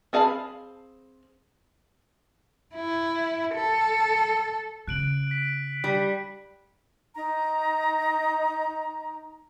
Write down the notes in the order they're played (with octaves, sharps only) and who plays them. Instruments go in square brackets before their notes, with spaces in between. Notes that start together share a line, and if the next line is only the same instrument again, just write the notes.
[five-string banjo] C4 G#4 F5 A5 B5
[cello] E4
A4
[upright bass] C#3 [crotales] F#6 D7 F#7
[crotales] B6
[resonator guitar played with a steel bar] G3
[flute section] D#4 A#5